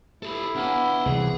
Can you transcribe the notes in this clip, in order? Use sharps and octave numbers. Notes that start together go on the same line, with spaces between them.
E4 G4 A4
B3 D4 F5 G#5 D6
C2 E3 G#4